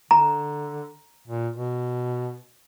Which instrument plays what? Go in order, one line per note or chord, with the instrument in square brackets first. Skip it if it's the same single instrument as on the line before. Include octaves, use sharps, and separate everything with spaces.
[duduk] D3 [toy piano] A#5
[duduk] A#2
B2